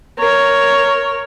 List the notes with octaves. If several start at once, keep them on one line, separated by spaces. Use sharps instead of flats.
A#4 C#5